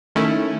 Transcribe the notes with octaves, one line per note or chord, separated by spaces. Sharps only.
D#3 A3 C#4 E4